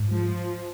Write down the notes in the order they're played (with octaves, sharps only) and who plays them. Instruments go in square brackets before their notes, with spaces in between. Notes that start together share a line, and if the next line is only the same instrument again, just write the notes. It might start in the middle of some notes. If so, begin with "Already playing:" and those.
Already playing: [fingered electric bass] G#2
[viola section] F3 [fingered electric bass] G#3